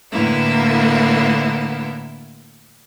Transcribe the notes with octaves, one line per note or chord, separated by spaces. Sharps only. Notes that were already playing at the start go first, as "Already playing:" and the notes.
A2 D3 A#3 B3 E4